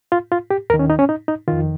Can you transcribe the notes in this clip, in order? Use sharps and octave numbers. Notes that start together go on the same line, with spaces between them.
F4
F4
G4
D#2 D#3 A#4
C#4
D#4
C#4
D#4
D#4
F2 D#3 F4